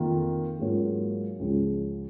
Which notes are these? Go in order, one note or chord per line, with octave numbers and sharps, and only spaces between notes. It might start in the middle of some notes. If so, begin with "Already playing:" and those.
Already playing: F2 D#3 A#3 F4
G#2 F#3 A#3 C#4 F4
C#2 C#3 F3 G#3